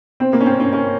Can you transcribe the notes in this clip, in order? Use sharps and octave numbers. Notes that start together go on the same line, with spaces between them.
C4
A#3
C#4
C4
C#4
C#4